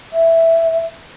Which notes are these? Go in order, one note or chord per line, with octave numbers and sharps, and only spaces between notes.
E5